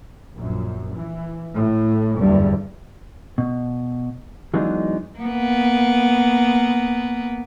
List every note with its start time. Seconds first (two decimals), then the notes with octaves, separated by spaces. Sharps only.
0.34 A#1 F#2
0.92 E3
1.56 A2
2.20 F#1 E2 G2 D3
3.38 B2
4.54 E3 F#3 G#3 B3 D4 D#4
5.19 A#3 B3